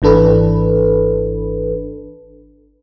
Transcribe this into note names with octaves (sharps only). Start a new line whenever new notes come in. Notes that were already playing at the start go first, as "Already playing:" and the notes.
G#1 E3 D4 A4 B4